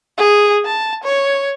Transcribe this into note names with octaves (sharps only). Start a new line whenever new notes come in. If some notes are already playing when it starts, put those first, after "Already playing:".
G#4
A5
C#5